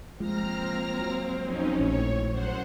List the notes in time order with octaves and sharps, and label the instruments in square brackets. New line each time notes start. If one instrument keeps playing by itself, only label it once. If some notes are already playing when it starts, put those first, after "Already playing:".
[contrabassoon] F3 [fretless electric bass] G#3 [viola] A#3 C4 [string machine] A#5 F6 A#6
[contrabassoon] F#3
[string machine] F2 C#4 D#4
[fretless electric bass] A#1 [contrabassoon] A2 [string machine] C#5
[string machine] F#2 C5 F#5